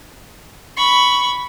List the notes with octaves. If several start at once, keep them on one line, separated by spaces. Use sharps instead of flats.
B5 C#6